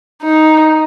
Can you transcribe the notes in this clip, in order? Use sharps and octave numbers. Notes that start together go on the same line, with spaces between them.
D#4